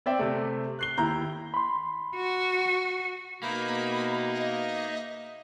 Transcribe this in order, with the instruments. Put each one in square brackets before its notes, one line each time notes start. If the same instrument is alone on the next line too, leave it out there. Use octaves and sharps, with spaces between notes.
[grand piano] C4 D5 E5 G5
C3 A3
F#6 C7 G7
D#2 E4 A#5 G6
[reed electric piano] B5 C6
[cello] F#4
[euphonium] B2 [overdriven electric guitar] A#3 [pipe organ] D#4 G#4 E5 [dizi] B5
[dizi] D#5